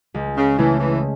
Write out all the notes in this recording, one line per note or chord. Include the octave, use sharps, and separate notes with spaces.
C#2
C#3
C#3 E3 A3
E3